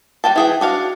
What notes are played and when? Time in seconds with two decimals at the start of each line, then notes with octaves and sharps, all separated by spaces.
0.24 G3 F#4 G5 A5
0.36 E3 G#4 G5
0.61 D4 F#4 F5